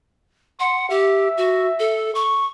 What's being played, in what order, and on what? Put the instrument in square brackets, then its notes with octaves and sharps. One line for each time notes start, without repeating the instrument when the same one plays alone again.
[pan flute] F#5 [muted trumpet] C6
[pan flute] G4 [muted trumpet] E5
[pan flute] F#4
A4
C#6